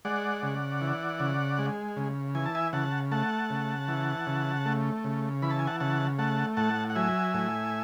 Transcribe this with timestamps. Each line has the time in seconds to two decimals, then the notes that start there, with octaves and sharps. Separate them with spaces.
0.05 G#3 D5 F#5
0.43 C#3
0.81 E3
1.20 C#3
1.59 G#3
1.97 C#3
2.35 E3 G#5
2.46 A5
2.55 E5 G#5
2.73 C#3 F#5 A5
3.12 A3 F#5 A5
3.50 C#3
3.88 E3
4.27 C#3
4.66 A3
5.04 C#3
5.42 E3 B5
5.51 A5
5.59 G#5
5.67 F#5 A5
5.80 C#3 F#5 A5
6.18 A3 F#5 A5
6.57 A2 F#5 A5
6.90 F#5
6.96 F#3 E5 G#5
7.34 A2